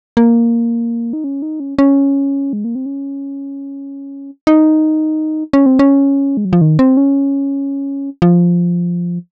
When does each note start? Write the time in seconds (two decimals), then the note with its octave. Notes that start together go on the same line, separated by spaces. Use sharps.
0.17 A#3
1.13 D#4
1.24 C#4
1.42 D#4
1.60 C#4
1.79 C#4
2.53 G#3
2.64 A#3
2.75 C4
2.86 C#4
4.47 D#4
5.53 C#4
5.66 C4
5.79 C#4
6.37 G#3
6.45 F#3
6.53 F3
6.61 D#3
6.79 C4
6.97 C#4
8.22 F3